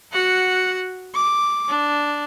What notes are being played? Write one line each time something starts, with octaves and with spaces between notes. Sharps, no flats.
F#4 F#5
D6
D4